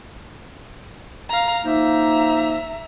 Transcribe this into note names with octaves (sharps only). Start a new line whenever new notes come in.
F5 A#5
F3 A#3 D#4 E5 A#5